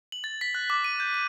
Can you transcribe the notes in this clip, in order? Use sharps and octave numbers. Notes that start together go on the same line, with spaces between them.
F#7
A6
B6
F#6
D6
D#7
G6
D#7